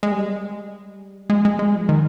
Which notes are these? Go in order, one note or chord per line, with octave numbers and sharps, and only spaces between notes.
G#3
G3
G#3
G#3
G#3
F3
D#3